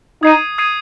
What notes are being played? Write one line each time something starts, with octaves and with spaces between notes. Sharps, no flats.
D#4 D#6 G#6 C7 D#7
D#6 G#6 C7 D#7